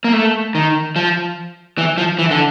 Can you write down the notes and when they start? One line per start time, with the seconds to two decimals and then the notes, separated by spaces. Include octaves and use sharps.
0.04 A#3
0.13 A3
0.55 D#3
0.96 F3
1.78 E3
1.98 F3
2.19 E3
2.31 D3